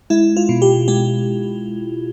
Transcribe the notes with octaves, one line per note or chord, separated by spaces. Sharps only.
G#3 E4
F4
B2
G4
G#3 G4